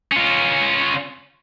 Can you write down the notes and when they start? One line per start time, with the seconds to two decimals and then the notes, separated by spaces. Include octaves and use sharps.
0.12 C#4 F4